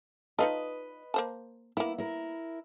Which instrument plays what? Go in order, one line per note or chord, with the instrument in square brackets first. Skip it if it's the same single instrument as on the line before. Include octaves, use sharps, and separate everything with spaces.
[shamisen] D#4 F4 A4 [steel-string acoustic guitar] B4 D#5
[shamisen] A#3 C5 A5
[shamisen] A#3 B3 [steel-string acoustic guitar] E4
[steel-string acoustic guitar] E4 A#4